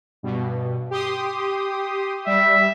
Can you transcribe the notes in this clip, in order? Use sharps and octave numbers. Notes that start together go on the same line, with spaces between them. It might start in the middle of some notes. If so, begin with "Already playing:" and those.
G2 B2
G4 C6 D#6
G3 E5